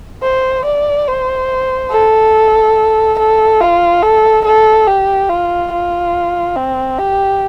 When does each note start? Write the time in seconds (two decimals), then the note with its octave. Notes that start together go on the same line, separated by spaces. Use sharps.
0.23 C5
0.65 D5
1.08 C5
1.91 A4
3.19 A4
3.60 F4
4.03 A4
4.45 A4
4.87 G4
5.29 F4
5.72 F4
6.56 C4
6.99 G4